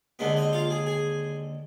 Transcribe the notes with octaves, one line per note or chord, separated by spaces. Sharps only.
D#2 D3 G#3 B3 B4
D#4 D#5
F4 F5
G#4 G#5
G#4 G#5